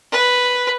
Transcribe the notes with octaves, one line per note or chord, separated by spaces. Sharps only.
B4